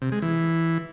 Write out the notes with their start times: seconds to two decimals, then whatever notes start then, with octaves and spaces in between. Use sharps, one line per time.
0.02 C3
0.12 G#3
0.22 E3